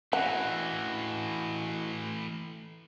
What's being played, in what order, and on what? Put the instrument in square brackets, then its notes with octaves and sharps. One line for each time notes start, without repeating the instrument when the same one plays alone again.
[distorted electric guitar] A2 E3 [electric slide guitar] E4 F#4 [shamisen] F#5